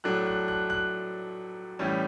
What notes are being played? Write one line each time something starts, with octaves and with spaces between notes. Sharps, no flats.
A2 F#3 A3 D4 F#6
F#6
F#6
F#6
A2 E3 G3 C#4